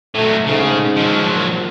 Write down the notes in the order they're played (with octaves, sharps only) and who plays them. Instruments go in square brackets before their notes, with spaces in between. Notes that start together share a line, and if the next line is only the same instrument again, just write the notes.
[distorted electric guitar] A2 F#3 [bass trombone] A3
[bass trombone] G#2 [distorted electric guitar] C#3
[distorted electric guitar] F3 F#3
[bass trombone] A#1